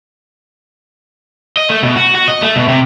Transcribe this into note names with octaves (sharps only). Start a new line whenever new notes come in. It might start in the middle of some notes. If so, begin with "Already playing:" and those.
D#5
A3
B2
F#4
F#4
D#5
A3
B2
C3